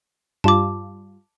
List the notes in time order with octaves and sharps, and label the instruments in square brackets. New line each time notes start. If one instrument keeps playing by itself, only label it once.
[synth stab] G2 G3 F4 [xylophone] A5 D6